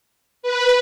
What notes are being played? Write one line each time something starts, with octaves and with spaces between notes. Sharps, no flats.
B4